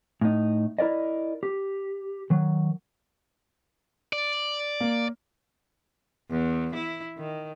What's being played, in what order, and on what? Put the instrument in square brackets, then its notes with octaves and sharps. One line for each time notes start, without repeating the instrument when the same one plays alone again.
[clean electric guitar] A2 D#4
E4 A#4 D5 D#5
G4
D#3 F#3
[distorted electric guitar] D5
[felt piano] A#3
[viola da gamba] E2
E4
D#3